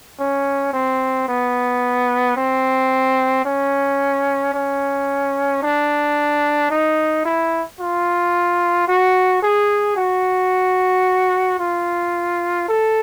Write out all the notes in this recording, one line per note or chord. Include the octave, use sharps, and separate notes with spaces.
C#4
C4
B3
C4
C#4
C#4
D4
D#4
E4
F4
F#4
G#4
F#4
F4
A4